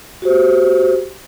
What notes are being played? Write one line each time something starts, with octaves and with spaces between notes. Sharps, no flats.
F#4 G4 C5